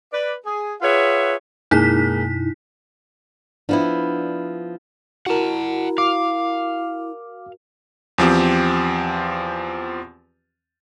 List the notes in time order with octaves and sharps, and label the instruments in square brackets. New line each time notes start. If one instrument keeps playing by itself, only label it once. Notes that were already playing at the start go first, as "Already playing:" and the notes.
[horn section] B4 D5
G#4
F4 G#4 B4 C#5 E5 F#5
[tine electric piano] F#2 B2 [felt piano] G#3 A#3 [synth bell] D#4 E4 B6
[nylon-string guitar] F3 B3 E4 [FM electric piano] D4
[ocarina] E4 [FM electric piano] F#4 A#4 [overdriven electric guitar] F#5 A5
[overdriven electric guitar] F5 [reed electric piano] D6
[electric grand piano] E2 F3 C4 G4